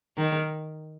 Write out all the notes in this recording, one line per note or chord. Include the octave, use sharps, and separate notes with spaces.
D#3